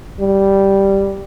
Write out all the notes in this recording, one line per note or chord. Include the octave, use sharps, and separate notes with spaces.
G3